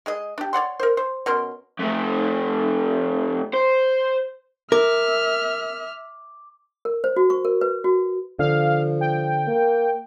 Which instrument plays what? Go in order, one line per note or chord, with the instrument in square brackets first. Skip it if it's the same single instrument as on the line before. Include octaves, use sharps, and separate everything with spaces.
[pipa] G#3 G#4 D#5
D4 G4
C#5 D5 F#5 C6
A#4 C5
C5
B2 C#4 A#4 C6
[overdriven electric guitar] F2 A3
C5
[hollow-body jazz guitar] A#4 [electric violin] E5 F6 [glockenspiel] D6
[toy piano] A#4
C5
F#4
C#6
A#4
B4
F#4
[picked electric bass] D3 [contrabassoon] F3 [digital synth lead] F5
[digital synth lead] G5
[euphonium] A#3